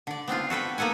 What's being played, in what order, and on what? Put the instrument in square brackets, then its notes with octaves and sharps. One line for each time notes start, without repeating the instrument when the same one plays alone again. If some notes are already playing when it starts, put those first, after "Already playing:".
[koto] D3 D5
B3 C4 D4 F4
F#4 A4 B4 G5
A#3 B3 A4 F#5 G#5